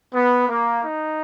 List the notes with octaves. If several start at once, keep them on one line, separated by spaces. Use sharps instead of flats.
B3
A#3
D#4